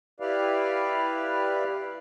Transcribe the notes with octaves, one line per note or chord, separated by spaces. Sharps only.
E4 G4 B4 D5 F5